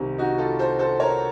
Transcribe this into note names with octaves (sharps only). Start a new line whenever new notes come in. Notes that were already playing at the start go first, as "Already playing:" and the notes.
Already playing: C2 C3 D#3
D#4 F#4
F4 A4
A4 C5
A4 C5
A#4 C#5